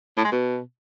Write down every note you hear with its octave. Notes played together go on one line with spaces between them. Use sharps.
A2
G#3
B2